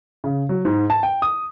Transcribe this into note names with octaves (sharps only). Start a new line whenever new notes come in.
C#3
F#3
G#2
A5
G5
D#6